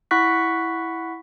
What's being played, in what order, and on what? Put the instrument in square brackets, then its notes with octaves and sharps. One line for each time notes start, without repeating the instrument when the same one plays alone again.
[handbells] E4 F#5 C#6 F#6 B6